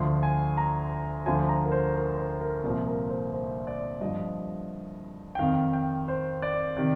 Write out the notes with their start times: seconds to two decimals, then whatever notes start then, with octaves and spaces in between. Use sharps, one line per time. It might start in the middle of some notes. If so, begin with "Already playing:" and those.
Already playing: D2 D3 F3 C6
0.23 G#5
0.57 A#5
1.26 D2 D3 F3 G#5
1.49 A#5
1.65 A#4
1.72 C5
1.95 A#4
2.18 C5
2.41 A#4
2.63 C2 A#2 F3 A#4
2.86 A#4
3.09 C5
3.33 C5
3.67 D5
4.01 G2 F3 D#5
5.35 G5
5.39 F2 D#3 F5
5.73 G5
6.08 C5
6.42 D5
6.77 C3 D#3 D5